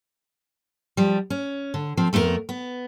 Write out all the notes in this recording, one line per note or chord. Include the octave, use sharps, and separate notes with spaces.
F3 G3
C#4
D3
F3 C4
F2 A3 B3 F#4 A#4
B3